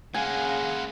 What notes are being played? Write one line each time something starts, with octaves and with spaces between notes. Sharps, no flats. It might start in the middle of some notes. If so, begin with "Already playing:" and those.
C#3 G#3 A#3 F5 F#5 G#5